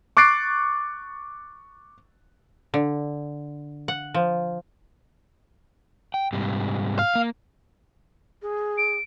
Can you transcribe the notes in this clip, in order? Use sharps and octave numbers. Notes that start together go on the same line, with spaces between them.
C#6 D6 F#6 A6 C7 D7
D3
F#5
F3
G5
G#2 C3 G3
F5
A#3
G#4
D7